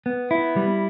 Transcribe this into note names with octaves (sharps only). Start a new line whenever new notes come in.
B3
E4
G3